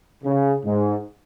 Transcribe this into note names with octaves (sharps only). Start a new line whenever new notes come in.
C#3
G#2